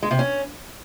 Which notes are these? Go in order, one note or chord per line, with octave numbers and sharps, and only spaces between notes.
G#3
C3
C#4